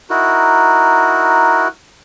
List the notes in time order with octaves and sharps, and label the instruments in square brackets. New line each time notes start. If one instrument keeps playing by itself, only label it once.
[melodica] D#4 E4 F#4 A#4